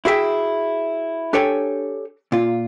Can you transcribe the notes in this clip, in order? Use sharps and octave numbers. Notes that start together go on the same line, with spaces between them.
E4 F#4 G#4 E5 G5
D4 G4 A4 C#5 G5 G#5
A#2 F4